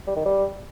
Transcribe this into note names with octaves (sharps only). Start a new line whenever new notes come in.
G3
D#3
G3